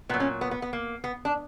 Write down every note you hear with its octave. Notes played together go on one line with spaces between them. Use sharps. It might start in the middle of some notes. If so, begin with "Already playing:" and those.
A#2 F#3 B3
C#4
B3
B3
B3
A#3
B3
D4